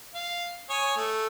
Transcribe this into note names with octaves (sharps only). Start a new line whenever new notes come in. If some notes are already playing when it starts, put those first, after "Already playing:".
F5
C#5 G#5 D#6
A3